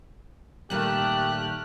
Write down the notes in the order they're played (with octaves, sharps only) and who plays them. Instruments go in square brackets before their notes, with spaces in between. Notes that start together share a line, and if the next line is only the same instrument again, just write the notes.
[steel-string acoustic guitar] A#2 D#3 G3 [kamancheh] A3 F6 [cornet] G4 [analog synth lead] F#6